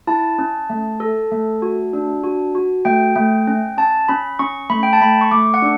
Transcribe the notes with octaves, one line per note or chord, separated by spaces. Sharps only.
E4 A5
C#4
A3
A4
A3
F#4
D4
F#4
F#4
A3 G5
A3
C#4
C#4 A5
C#4 B5
C#4 C#6
A3 B5
G5
A5
A3 B5
C#6
A3 D6
F#5
D4